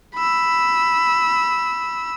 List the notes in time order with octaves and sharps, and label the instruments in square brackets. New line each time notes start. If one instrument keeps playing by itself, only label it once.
[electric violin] B5 E6